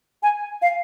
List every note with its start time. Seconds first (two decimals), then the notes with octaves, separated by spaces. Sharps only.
0.23 G#5
0.62 F5